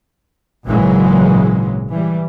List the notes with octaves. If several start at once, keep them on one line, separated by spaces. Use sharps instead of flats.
G#1 A#2 C#3 E3 F#3 G#3
E3 G3